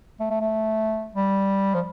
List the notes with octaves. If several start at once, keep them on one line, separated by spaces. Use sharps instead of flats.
A3
A3
A3
G3
F3